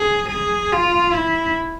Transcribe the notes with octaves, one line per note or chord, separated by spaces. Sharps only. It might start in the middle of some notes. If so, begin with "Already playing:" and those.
Already playing: G#4
G#4
F4
E4